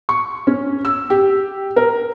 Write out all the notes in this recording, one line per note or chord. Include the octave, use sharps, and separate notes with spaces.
C#6
C#4
E6
G4
A#4